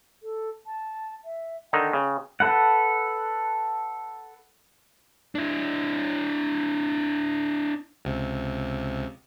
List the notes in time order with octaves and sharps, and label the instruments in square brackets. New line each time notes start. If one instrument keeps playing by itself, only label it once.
[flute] A4
A5
E5
[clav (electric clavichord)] D3 D#3 D#4 [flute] G5
[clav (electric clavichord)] C#3
[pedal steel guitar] A4 B4 F#5
[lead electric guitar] D4 E4
[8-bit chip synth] C#2 C3